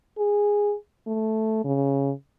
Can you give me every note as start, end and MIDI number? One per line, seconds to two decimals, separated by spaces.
0.18 0.74 68
1.07 1.60 57
1.65 2.12 49